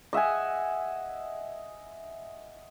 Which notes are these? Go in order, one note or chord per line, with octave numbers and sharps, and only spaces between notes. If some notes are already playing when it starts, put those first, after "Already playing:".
D#5 E5 F#5 G#5